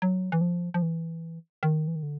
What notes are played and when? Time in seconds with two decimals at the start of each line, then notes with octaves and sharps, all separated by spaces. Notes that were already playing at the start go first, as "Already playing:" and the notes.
0.02 F#3
0.32 E3
0.41 F3
0.74 F3
0.82 E3
1.63 D#3
1.88 E3
1.95 D#3
2.03 D3